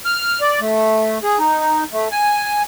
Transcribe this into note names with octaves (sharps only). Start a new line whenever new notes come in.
F6
D5
A3
G#4
D#4
A3
G#5